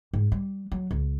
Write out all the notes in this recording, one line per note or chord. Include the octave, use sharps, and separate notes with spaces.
G#2
G3
F#3
C#2